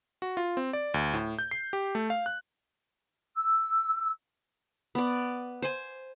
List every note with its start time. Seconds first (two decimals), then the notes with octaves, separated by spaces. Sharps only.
0.22 F#4
0.37 F4
0.57 C4
0.73 D5
0.94 D2
1.13 A2
1.39 G6
1.51 C7
1.73 G4
1.95 A3
2.10 F5
2.26 F#6
3.36 E6
4.95 B3 D5
5.62 C5 G#5